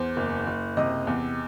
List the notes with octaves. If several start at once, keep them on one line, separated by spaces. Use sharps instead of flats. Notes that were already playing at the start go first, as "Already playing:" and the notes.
Already playing: E2 C5
F#1
F#1
C3 D#5
E2